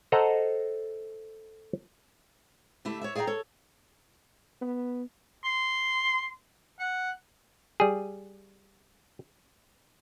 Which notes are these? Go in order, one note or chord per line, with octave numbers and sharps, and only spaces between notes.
A4 C5 D#5 F#5 A#5
D3 A3 E4 G4
C#5 D5 E5
G#4 D5 E5 F5 G5 A#5
A4 C#5
B3
C6
F#5
G3 G#4